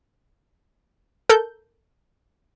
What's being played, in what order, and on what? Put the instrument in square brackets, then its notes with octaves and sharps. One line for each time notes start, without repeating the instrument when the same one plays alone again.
[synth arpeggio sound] A4 A#4 G6